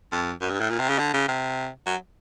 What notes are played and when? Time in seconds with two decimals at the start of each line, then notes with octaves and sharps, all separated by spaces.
0.12 F2
0.41 F#2
0.50 G2
0.60 A2
0.70 A#2
0.79 C3
0.89 C#3
0.98 D3
1.13 C#3
1.28 C3
1.86 F#3